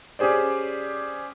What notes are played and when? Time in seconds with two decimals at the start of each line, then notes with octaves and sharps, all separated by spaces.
0.19 C#4 G4 G#4 C5 D5